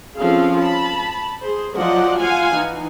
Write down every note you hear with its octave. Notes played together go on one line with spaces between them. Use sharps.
F3 C4 C#4 G#4 A4 F5
A5 B5
G#4 C5
F3 F#3 D5 D#5 F#5
F4 F5 F#5 G#5
E3 D#4